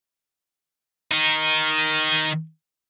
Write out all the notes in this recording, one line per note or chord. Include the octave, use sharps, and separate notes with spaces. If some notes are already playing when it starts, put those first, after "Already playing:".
D#3 D#4